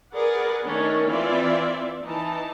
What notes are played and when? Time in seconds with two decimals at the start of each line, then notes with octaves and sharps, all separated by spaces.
0.14 G#4 A#4 B4 D5 F#5
0.63 D#3 A3 C#4 D4
1.08 E3 C4 F4 D5 E5
2.04 E3 D#4 A5